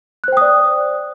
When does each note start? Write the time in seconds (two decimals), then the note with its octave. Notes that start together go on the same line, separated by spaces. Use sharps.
0.24 F#6
0.28 C5
0.32 G5
0.37 D#6
0.41 D5